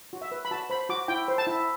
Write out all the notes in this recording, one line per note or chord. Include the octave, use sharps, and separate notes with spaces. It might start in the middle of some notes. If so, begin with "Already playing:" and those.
F#4
E5
B4
B5
F#4 A5
C5 B5
F#4 D6
E4 G5
C5
A5
E4